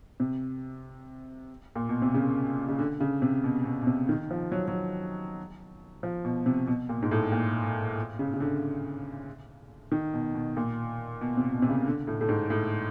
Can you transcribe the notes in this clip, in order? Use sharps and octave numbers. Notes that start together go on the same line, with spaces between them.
C3
A#2
B2
C3
C#3
C#3
D3
C#3
C3
B2
B2
B2
C3
D#3
F3
F#3
F#3
F3
B2
C3
B2
A#2
G#2
A2
A#2
C#3
C#3
D3
D#3
B2
B2
A#2
B2
C3
B2
C3
C#3
D3
A2
A2
G#2
A2